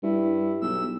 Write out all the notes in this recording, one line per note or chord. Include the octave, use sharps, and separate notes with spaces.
G2 E4
B1 E6